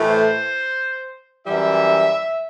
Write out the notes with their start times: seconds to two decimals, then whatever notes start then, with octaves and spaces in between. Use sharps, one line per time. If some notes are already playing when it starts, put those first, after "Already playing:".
Already playing: A2 E3 A3
0.09 C5
1.47 F#2 E3 G3 E5